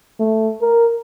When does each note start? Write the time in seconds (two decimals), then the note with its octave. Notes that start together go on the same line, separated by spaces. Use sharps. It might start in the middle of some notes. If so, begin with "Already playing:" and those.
0.20 A3
0.62 A#4